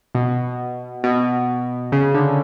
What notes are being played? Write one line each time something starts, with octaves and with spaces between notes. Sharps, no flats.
B2
B2
C#3
D3